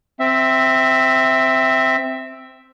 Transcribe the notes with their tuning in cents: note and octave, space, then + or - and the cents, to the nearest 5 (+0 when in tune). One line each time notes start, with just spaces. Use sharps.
C4 +0 E5 +0